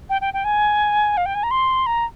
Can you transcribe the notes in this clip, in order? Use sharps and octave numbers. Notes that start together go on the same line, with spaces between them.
G5
G5
G5
G#5
F5
G5
G#5
A#5
C6
A#5